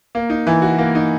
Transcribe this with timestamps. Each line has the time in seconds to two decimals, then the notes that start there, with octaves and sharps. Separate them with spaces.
0.15 A#3
0.30 D#4
0.47 E3
0.62 F#4
0.78 A#3
0.95 D#4